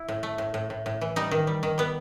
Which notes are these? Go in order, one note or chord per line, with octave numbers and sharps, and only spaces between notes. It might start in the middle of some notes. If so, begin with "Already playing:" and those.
Already playing: E4
A2
A3
A2
A2
A2
A2
E3
G3 D#4
D#3
G3
D#3
G3 B3